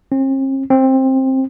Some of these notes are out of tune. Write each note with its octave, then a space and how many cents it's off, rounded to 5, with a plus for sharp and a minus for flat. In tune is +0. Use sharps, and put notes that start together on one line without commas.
C4 +45
C4 +15